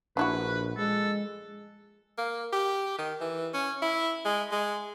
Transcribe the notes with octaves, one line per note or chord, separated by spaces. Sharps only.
A#1 D4 E4 F#4 B4
G#3 A4
A#3
G4
D#3
E3
C#4
E4
G#3
G#3